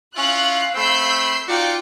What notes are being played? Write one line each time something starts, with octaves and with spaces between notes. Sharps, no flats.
C#4 E4 F4 F5 F#6
A3 C4 B5 E6 G6 C7
D#4 F4 F#4 D5 G5 C#7